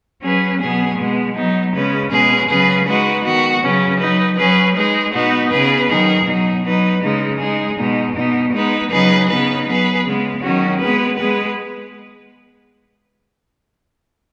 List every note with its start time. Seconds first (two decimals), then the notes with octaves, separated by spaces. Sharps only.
0.23 F#3 C#4 G#4 B4
0.61 B2 F#3 B3 G#4
0.98 B2 G#3 B3
1.35 F#3 B3 D#4
1.74 C#3 G#3 C#4 B4
2.11 B2 G#3 C#4 G#4 B4
2.49 C#3 F#3 C#4 G#4 B4
2.86 G#3 D#4 F#4 B4
3.24 D#3 B3 F#4
3.62 C#3 F#3 C#4 B4
3.99 F#3 D#4 B4
4.37 F#3 C#4 G#4 B4
4.76 G#3 D#4 G#4 B4
5.14 B2 B3 D#4 F#4 B4
5.51 C#3 B3 G#4 B4
5.88 D#3 F#3 D#4 G#4
6.26 B2 F#3 D#4
6.64 F#3 D#4 B4
7.02 C#3 G#3 D#4
7.40 G#3 D#4 G#4
7.77 B2 G#3 D#4
8.15 B2 B3 D#4
8.53 G#3 B3 D#4 B4
8.90 C#3 F#3 D#4 G#4 B4
9.28 C#3 B3 D#4 B4
9.66 F#3 B3 G#4 B4
10.04 C#3 G#3 B3
10.42 D#3 F#3 C#4 F#4
10.79 G#3 B3 G#4 B4
11.18 G#3 B3 G#4 B4